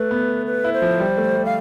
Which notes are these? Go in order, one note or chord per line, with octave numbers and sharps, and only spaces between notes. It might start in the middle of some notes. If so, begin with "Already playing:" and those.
Already playing: A3 B4
B3
B4
E4
C5
F3
G3
A3
G3
F5